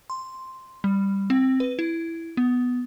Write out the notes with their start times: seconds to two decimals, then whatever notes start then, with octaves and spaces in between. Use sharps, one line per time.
0.10 C6
0.84 G3
1.30 C4
1.60 B4
1.79 E4
2.37 B3